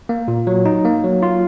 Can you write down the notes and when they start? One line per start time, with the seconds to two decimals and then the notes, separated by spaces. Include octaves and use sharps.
0.09 A#3
0.28 A#2
0.47 F#3
0.66 D#4
0.85 A#3
1.04 F#3
1.23 F4